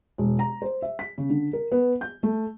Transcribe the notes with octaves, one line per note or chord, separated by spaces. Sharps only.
E1
A#5
C5
E5
B6
C#3
D3
A#4
B3
G6
A3